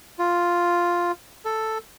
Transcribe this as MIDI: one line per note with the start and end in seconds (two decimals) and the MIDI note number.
0.19 1.12 65
1.45 1.78 69